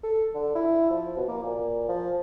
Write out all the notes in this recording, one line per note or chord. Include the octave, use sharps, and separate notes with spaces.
A4
D3
E4
F3
B2
A#3
A#2
F3